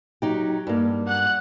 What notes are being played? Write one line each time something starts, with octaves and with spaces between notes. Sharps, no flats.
F#3 D#4 G4
G2 A#3
F#5 F#6